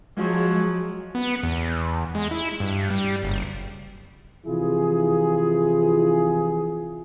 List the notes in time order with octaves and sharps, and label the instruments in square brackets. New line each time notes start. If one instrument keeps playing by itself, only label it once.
[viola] F3 F#3 [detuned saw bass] G#3
[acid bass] B3
E2
G#3
E4
G2
G3
F#1
[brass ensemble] C3 E3 F3 E4 F4 G#4